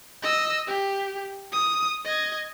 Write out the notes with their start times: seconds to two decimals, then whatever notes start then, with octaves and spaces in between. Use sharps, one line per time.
0.22 D#5 E6
0.67 G4
1.53 D#6
2.05 D#5 G#6